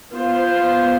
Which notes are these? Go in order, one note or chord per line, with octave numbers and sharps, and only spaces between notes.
B3 F4 C5